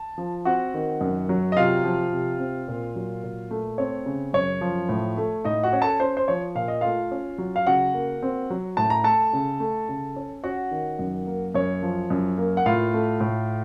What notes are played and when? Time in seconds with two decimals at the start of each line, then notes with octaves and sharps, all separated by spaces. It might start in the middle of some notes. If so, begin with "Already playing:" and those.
Already playing: A5
0.18 F3
0.45 C4 F#4 F#5
0.74 D#3
1.01 F#2
1.29 F#3
1.52 D#5
1.57 C3 F4 F5
1.84 F3
2.12 C3
2.39 C4
2.68 A#2
2.96 F#3
3.24 A#2
3.51 A3
3.78 C4 C#5
4.06 C#3
4.34 F#2 C#5
4.61 F3
4.89 A2
5.17 A3
5.45 A2 D#4 D#5
5.63 F#4 F#5
5.73 C#4
5.82 A4 A5
6.00 C#4 C5
6.17 C5
6.28 F3 C#5
6.55 A#2 F5
6.68 D#5
6.81 A3 F4 F5
7.11 C#4
7.38 F#3
7.56 F5
7.66 C#3 F#4 F#5
7.94 A#3
8.22 C4
8.50 F#3
8.77 A2 A5
8.90 A#5
9.04 A3 A4 A5
9.33 C#3
9.60 A3
9.89 C#3
10.16 C#4
10.44 C#4 F#4 F#5
10.71 D#3
10.99 F#2
11.27 A#3
11.55 F#2 C#5
11.83 F3
12.10 F#2
12.38 A#3
12.57 F#5
12.66 A2 F4 F5
12.94 A3
13.20 A2